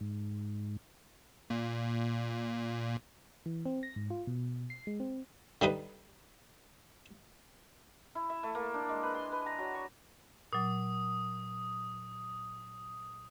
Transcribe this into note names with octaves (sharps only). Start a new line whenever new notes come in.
G#2
A#2
E3
C4
A#6
G#2
F4
B2
C7
G#3
C4
D3 G3 D#4 B4
E4
E5
A3
A#3
D4
G#3
B4
C6
B4
A#5
F#3
C#6
A#2 F#3 D#6